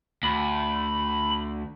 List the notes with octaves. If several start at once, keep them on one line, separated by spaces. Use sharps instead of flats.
D2 B5